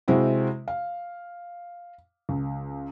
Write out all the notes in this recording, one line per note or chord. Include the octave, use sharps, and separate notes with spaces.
C3 G#3 C4 E4 F#4
F5
C#2